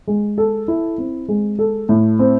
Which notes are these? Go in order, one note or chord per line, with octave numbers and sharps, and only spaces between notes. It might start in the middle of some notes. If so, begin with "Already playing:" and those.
G#3
A4
E4
C4
G#3
A4
A2
C4